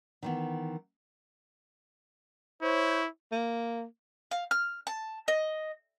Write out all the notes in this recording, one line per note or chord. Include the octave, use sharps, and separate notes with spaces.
D#3 E3 B3
E4 C5 C#5
A#3
F5
F6
A5
D#5